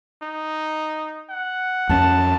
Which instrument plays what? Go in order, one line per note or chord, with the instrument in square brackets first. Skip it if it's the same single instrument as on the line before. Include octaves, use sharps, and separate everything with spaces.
[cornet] D#4
F#5
[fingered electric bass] F2 A#3 C#4 [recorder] A5